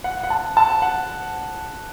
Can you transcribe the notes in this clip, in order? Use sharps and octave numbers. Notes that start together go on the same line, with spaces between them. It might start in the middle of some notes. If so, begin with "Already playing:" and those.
F#5
F#5
A5
A5
F#5